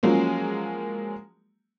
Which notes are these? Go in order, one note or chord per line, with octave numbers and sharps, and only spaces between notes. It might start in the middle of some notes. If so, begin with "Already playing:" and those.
F3 F#3 G#3 A#3 C#4